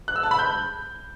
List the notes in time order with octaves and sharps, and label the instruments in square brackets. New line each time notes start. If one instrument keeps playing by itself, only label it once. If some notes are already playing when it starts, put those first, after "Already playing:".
[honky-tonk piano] F#6
E6
A5
B5
G6